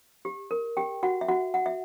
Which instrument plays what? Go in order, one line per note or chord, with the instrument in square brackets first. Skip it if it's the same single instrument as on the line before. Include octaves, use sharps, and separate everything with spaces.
[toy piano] G4
A#4
G4 G5
F#4 F#5
E5
F#4 F#5
F#5
E5